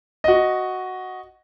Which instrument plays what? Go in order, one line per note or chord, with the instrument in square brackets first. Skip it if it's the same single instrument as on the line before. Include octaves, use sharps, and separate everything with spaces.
[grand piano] F#4 D#5